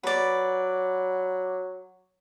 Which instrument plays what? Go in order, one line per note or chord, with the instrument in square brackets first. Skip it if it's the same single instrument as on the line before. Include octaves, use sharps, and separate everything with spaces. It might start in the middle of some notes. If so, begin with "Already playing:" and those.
[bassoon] F#3 [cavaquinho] B4 D5